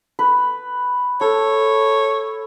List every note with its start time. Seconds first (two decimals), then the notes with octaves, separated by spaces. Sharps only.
0.19 B4
1.21 A4 C#5